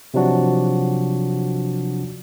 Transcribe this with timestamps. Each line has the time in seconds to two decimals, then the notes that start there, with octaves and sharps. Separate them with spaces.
0.14 C3 F3 F#3 D4 F#4